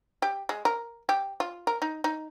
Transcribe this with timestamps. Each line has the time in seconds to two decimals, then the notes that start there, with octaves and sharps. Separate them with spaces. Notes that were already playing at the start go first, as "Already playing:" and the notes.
0.22 G4
0.49 G#3
0.65 A#4
1.09 G4
1.40 F4
1.67 A#4
1.82 D#4
2.04 D#4